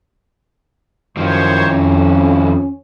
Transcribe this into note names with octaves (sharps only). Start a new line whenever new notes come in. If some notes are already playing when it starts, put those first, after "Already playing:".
F#2 D#3 F3 C5 C#5
F2 C#4